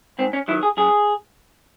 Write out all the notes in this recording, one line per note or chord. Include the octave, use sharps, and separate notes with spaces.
G#2 C4
C#4
D#3 F#3 E4
G#4
F#2 G#4